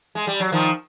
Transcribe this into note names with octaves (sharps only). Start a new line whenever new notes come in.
G#3
G3
F#3
D#3 F3